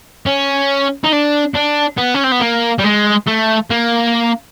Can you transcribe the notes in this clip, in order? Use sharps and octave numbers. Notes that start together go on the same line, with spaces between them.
C#4
D#4
D4
D4
B3
C#4
C4
B3
A#3
G3
G#3
A3
A#3